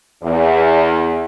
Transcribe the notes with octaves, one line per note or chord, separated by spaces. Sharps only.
E2